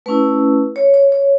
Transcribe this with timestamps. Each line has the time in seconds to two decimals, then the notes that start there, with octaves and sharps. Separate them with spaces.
0.06 A3 C#4 E4 B4
0.76 C#5
0.94 C#5
1.12 C#5